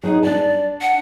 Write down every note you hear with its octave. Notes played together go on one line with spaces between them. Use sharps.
F#3 D#4 G#4
D4 D5 A5
F#5